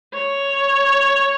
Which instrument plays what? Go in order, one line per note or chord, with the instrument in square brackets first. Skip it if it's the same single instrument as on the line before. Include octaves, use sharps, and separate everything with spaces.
[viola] C#5